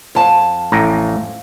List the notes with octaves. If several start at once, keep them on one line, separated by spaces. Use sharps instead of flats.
F2 A5
A1 A2 A#5